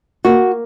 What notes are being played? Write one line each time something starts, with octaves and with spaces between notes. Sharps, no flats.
A#3 F#4